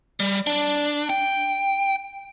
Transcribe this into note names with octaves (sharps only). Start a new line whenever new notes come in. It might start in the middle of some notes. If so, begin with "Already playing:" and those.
G3
D4
G5